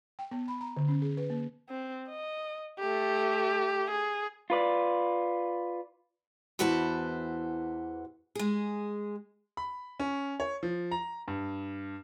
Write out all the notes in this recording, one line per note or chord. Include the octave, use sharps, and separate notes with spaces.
G5
B3
B5
A#5
D3
C#4
G#4
B4
A#3
C4
D#5
A3 G4
G#4
F4 B4 D5
E2 E3 F#4 B4 C5 A5
G#3 G#4
B5
C#4
C#5
F3
A#5
G2